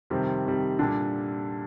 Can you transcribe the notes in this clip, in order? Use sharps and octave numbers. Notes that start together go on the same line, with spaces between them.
F2 C3 D#3 G3 C4
F2 D#3 G3
A#2 D3 G3 D4